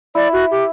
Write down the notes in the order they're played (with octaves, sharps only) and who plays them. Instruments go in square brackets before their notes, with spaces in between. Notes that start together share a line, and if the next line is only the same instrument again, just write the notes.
[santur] E4 [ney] D5
[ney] F#4
G4